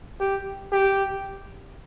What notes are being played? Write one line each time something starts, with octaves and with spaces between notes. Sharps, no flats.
G4
G4